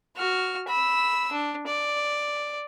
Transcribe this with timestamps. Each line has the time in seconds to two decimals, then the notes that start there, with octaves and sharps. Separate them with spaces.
0.16 F#4 F6
0.68 B5 E6
1.32 D4
1.67 D5